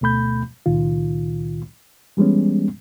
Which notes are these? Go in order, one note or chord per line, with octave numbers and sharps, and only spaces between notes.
D2 B2 A3 B5 G6
C#2 A#2 D#3 F4
E3 G3 G#3 B3 C#4